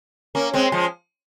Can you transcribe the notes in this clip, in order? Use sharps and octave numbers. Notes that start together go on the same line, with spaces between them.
A#3 C#4
G#3 C4
F3 G#3